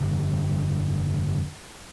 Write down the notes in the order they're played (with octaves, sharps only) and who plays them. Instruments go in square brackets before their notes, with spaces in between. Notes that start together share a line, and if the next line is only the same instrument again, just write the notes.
[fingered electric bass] F1 G2 D3